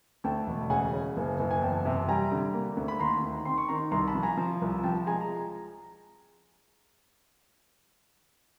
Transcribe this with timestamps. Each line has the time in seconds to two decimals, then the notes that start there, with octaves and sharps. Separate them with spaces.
0.24 D2 G5 A5
0.47 E1
0.70 C#3 F#5 G#5
0.93 C#3
1.17 F#1
1.39 F#1
1.51 G#5
1.62 E2 G5 A5
1.86 C3
2.08 G3 G#5 A#5
2.32 D3
2.54 A#3
2.77 D2
2.88 B5
2.99 D#2 A#5 C6
3.23 D#3
3.45 C4 C6
3.58 C#6
3.68 D#3 A#5 C6
3.91 C2 A#5 C6
4.07 A5 B5
4.15 F3
4.23 G#5 A#5
4.37 F3
4.61 C2
4.84 F3 G5 A5
5.06 G#3 G#5 A#5
5.21 A#5